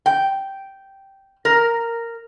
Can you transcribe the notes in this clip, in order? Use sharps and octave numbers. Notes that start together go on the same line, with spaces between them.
G5
A#4